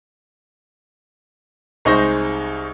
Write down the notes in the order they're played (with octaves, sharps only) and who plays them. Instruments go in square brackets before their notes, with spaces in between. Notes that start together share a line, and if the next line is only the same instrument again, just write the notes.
[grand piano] C2 G#3 D#4 C5 C#6 A#6